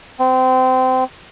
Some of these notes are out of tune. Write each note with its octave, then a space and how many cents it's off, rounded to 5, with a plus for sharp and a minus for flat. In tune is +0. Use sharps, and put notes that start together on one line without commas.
C4 -25